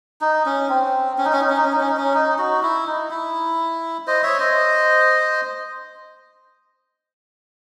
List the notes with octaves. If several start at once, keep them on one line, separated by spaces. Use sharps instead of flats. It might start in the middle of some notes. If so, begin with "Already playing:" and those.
D#4
C#4
C4
C#4
D#4
C#4
D#4
C#4
D#4
C#4
D#4
C#4
D#4
C#4
D#4
D#4 F#4
E4
D#4
E4
C5 D#5
C#5 E5
C5 D#5